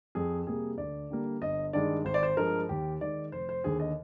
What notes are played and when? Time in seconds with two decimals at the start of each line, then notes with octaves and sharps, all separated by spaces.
0.15 F2 G#4
0.47 C3 G3 A#3 G#4
0.78 D2 D5
1.10 D3 G3 A#3
1.42 G1 D#5
1.73 G2 D#3 G#3 D5
2.05 G#1 C5
2.14 D5
2.23 C5
2.37 G2 F3 G#3 A#4
2.69 D#2 G4
3.01 D#3 G#3 D5
3.32 F1 C5
3.49 C5
3.64 D#2 D3 G#4
3.80 D#5